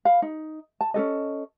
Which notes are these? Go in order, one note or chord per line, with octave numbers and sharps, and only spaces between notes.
F5 B5
D#4
A5
C#4 D4 A4 D#5